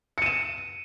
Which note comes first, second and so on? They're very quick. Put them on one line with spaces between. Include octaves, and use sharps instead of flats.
C#7 D#7 E7